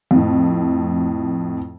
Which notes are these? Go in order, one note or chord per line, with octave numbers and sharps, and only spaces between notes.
F2 A2